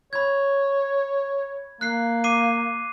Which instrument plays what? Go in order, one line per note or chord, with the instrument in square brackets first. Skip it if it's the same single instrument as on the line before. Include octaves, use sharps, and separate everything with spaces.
[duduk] C#5 [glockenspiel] B5 G#6
[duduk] A#3 [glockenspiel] F#6 C7
[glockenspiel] D6 C7 D#7